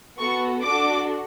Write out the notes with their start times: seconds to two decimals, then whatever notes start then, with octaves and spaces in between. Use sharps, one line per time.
0.19 B3 F#4 A4 C#6
0.66 D4 F#4 A4 D6